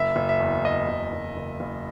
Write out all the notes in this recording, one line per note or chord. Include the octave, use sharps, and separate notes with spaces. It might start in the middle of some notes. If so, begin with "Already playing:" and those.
Already playing: F#1 E5
F#1
E5
E2
E2 D#5
F#1
F#1
F#1
F#1